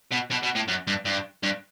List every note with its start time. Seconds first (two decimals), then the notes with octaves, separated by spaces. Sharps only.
0.11 B2
0.30 B2
0.43 B2
0.55 A2
0.68 F#2
0.87 G2
1.05 G2
1.43 G2